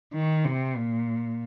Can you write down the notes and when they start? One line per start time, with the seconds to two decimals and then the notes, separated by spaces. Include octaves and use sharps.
0.13 D#3
0.45 C3
0.77 A#2